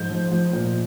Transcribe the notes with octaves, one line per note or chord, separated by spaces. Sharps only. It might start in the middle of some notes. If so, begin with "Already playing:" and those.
Already playing: G#2 F3 G6
F3
F3
A#2